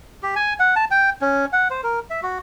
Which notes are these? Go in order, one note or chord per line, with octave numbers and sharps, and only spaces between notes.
G4
G#5
F#5
A5
G5
C#4
F#5
C5
A#4
E5
F#4